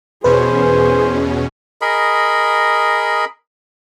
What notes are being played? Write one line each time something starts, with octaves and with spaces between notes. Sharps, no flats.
E2 B2 C#4 G#4 B4 C5
G#4 A#4 D#5 B5